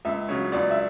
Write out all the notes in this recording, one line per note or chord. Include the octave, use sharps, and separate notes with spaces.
C#2 E5
C#3 F#3 C#5
C#2 D5
E5